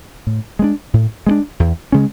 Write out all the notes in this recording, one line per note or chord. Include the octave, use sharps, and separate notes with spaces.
A2
G#3 B3 D4
A2
G#3 B3 D4
E2
C#3 G#3 C#4